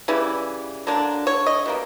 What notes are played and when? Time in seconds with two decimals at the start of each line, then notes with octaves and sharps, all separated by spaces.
0.08 C#3 E3 G3
0.87 D3 F#3 A#3 D4
1.27 C#5
1.46 D#5
1.66 B2 G3 A#3